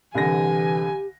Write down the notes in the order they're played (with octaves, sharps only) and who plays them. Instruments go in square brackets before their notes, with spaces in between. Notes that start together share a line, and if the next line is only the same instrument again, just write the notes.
[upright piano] C2 D3 A#6 [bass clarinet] E3 [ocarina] G4 [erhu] G#5